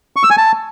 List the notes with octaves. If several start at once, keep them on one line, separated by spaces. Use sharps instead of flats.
C#6
E6
G#5
A5